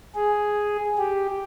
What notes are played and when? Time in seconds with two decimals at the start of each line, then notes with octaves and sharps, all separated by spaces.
0.16 G#4
0.98 G4